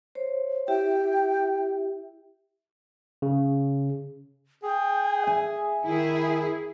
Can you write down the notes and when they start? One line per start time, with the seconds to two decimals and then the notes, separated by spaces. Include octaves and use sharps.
0.15 C5 C#5
0.68 E4 G4 E5 G5
3.22 C#3
4.64 G#4 G5
5.27 E5 G#5
5.86 D#3 E4 G#4